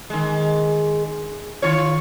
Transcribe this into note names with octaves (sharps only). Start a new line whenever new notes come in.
D#3 G#3
D#3 F4 C#5